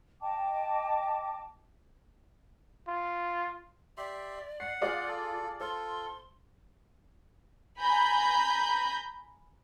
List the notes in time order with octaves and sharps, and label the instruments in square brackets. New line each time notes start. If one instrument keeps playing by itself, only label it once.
[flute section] D#5 G5 A5 D6
[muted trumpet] F4
[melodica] G4 E5 C6 [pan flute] D5
[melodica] F#5 [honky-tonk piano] C7
[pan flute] F4 [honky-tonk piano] G#4 D5 F5
[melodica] A4
[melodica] F4 A4 [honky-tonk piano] C5 [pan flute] C6
[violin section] G#5 A#5 B5 G6